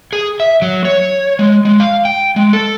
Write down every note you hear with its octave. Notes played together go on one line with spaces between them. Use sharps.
G#4
E5
F#3
C#5
G#3
G#3
F5
G5
G#3
A4